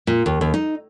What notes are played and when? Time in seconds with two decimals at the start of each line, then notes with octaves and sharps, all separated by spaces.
0.07 A#2
0.26 D#2
0.41 D#2
0.54 D#4